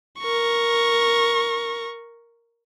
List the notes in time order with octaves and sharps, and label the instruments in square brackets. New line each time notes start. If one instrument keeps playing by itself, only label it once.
[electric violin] A#4 C#6